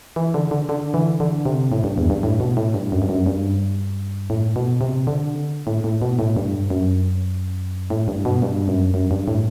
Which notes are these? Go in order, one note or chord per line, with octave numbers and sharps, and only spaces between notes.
E3
D3
D3
D3
E3
D3
C3
A2
G2
E2
G2
A2
B2
A2
G2
F#2
G2
F#2
G2
A2
B2
C3
D3
A2
A2
B2
A2
G2
F#2
A2
G2
B2
G2
F#2
F#2
G2
A2